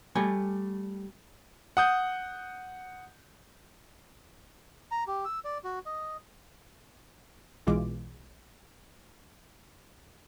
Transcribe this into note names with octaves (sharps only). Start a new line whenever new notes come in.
G3 A3 G#5
F#5 D#6 G6
A#5
G4
E6
D5
F#4
D#5
B1 B2 E3 G#3 F4 D6